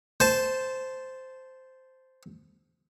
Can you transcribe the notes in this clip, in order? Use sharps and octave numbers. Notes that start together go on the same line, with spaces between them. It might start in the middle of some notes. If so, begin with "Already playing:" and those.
C5 A5